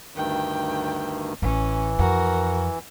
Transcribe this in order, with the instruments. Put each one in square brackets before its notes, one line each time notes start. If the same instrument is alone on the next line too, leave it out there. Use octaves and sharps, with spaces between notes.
[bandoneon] D2 G2 D#3 [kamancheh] G5
[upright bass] A1 [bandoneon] E3 [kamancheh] C#4
[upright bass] F2 [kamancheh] F#4 A#4